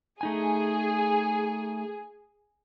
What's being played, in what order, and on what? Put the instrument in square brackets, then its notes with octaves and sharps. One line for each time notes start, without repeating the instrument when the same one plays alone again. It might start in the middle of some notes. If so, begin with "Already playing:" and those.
[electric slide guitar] A3 D#4 G#5 [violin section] G#4